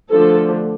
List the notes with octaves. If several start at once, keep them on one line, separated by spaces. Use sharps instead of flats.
D3 F3 A3 D4 A4